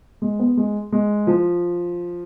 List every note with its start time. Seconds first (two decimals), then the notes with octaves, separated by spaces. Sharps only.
0.22 G#3
0.39 B3
0.57 G#3
0.92 G#3
1.27 F3